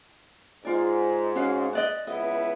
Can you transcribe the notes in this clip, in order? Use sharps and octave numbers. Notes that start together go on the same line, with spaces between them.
G#2 F4 D5
C#4 F#4 F5
B4 D5 D#5
C#2 B3 E4 D#5